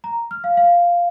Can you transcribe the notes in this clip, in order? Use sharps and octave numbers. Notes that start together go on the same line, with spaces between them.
A#5
F6
F5
F5